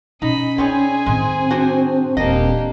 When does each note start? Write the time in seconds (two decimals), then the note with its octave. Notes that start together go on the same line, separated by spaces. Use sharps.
0.22 B2 C#4 D#4 D#5 B5
0.58 C4 D#4 G#4 C#5 D5 G#5
1.06 A2 D#3 G#3 C4
1.50 D4 F#4 C5
2.17 D#1 E3 A#3 D4 G4 D#5